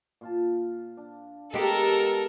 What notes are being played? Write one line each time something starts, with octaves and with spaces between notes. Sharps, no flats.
A#2 F4 A5
D4
G#3 B3 G4 A4 A#4